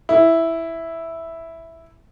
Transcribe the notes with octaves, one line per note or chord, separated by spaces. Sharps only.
E4